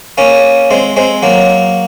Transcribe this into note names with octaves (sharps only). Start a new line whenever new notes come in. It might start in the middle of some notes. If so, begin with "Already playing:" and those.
A#3 C#4
G#3 C4
G#3 C4
F#3 A#3